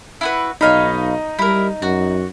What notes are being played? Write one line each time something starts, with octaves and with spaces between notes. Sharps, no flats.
E4 F#4 B4
B1 D#4 C#5 D#5 F5 B5
G3 E4 A#4
F#2 F#4